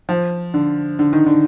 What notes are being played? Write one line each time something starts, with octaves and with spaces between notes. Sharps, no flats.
F3
D3
D3
D#3
D3